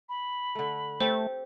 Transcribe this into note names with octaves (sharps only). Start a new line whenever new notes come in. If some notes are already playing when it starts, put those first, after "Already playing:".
B5
D3 A3
A3 C4 G4 A4 C5